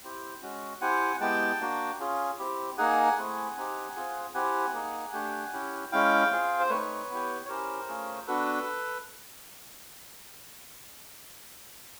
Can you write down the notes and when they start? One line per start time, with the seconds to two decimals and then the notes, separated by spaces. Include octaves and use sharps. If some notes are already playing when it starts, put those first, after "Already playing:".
0.03 C4 E4 G4
0.42 G#3 C#4 F#4
0.81 C4 E4 G4 F#5 G#5
1.21 G#3 B3 E4 G4 G5 A5
1.61 A#3 D4 F#4
2.00 C#4 F4 G#4
2.38 C4 E4 G4
2.78 A#3 D#4 G#4 F#5 G#5
3.18 A3 C4 E4 G#4
3.57 C4 D#4 G4
3.96 C4 F4 G#4
4.34 C4 E4 G4 F#5 G#5
4.74 A#3 D#4 G#4
5.13 A3 D4 G4
5.53 C#4 E4 G4
5.92 G#3 C#4 E4 F5 G5
6.31 C4 F4 G#4
6.60 C5
6.70 A3 C4 D#4 B4 C#5
7.09 B3 E4 G4
7.45 C#5
7.49 C#4 E4 G4 A#4 C5
7.88 A3 C#4 F4 G#4
8.27 B3 D4 F#4 A4 B4